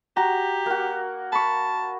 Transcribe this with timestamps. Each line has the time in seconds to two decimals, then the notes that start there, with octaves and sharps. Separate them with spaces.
0.17 F#4 G4 A#5
0.66 A#3 F#4
1.32 A5 B5 C#6